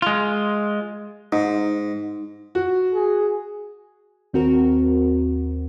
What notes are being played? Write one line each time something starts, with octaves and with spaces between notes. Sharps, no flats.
G#3 F4
G#2 D#4
F#4
G#4
D#2 C4 F#4 A#4